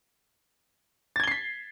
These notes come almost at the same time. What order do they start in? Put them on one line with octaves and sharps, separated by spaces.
A6 G#6 G7 C7 B6